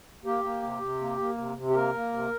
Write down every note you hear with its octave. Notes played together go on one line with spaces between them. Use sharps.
A#3 G4
A#3
C3
C3
A#3
A#3
C3
C3
G4
A#3 A#4
A#3
C3